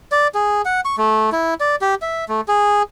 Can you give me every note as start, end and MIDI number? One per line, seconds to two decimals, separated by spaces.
0.12 0.28 74
0.34 0.62 68
0.65 0.81 78
0.85 0.96 85
0.98 1.30 57
1.32 1.54 64
1.60 1.76 74
1.81 1.95 67
2.02 2.25 76
2.29 2.41 57
2.48 2.82 68